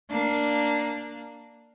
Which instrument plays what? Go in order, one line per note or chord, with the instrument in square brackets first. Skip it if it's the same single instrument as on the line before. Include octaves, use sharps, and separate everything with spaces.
[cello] A#3 D4